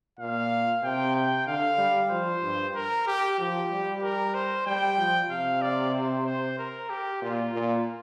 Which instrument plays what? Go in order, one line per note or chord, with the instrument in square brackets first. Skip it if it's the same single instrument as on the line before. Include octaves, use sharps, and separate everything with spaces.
[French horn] A#2 [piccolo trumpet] F5
[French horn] C3 [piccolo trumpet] G5
[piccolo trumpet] G5
[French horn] D3 [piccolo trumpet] F5
[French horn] G3
[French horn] F3 [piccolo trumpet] C5
[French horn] G2
[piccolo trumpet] A#4
G4
[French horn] F3 [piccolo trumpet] G4
[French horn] G3
[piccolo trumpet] A#4
C5
[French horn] G3 [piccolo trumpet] G5
[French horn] F3
[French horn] C3 [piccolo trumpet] F5
[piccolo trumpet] D5
C5
C5
A#4
G4
[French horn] A#2 [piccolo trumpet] F4
[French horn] A#2